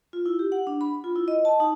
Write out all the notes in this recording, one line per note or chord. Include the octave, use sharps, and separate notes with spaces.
F4
E4
G4
F#5
D4
B5
F4
E4
D#5
A5
D#4